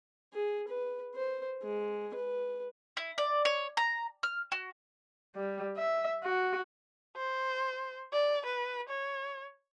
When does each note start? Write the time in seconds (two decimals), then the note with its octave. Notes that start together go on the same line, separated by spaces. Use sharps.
0.34 G#4
0.68 B4
1.15 C5
1.62 G#3
2.14 B4
2.97 E4
3.18 D5
3.45 C#5
3.77 A#5
4.23 F6
4.52 F#4
5.36 G3
5.77 E5
6.24 F#4
7.17 C5
8.13 D5
8.46 B4
8.89 C#5